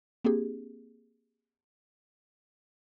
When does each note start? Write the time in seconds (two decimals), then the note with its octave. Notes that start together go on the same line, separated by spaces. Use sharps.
0.24 A#3 C4 D4 G4 G#4